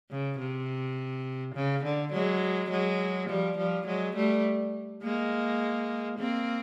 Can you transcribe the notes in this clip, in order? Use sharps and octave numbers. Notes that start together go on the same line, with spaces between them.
C#3
C3
C#3
D3
F#3 G#3
F#3 G#3
F3 G3
F3 G3
F#3 G#3
G3 A3
G#3 A#3
A#3 C4